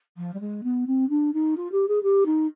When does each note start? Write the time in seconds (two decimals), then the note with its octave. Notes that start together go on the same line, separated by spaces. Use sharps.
0.17 F3
0.34 G3
0.40 G#3
0.63 B3
0.87 C4
1.09 D4
1.34 D#4
1.57 F4
1.72 G4
1.88 G#4
2.03 G4
2.26 D#4